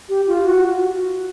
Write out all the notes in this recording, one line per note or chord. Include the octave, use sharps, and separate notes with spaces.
G4
F4
F#4